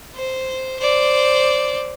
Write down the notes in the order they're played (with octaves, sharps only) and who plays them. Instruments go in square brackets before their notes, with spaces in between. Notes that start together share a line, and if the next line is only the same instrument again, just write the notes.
[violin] C5
C5 D5